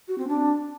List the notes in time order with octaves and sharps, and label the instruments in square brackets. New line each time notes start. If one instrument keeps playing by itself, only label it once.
[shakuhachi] F#4
C4
D4